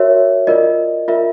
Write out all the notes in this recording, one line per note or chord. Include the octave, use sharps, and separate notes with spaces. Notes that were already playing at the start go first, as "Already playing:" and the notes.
Already playing: F#4 A#4 C#5 E5
F4 A#4 D5 D#5
F4 A#4 D5 E5